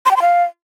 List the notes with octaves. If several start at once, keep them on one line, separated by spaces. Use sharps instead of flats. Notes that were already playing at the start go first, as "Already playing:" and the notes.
C6
G5
C6
F5